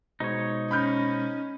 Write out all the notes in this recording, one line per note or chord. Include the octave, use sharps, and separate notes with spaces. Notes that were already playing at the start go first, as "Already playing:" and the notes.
B2 G#3 D#4 C5 C#5
C#4 B5 F6 G6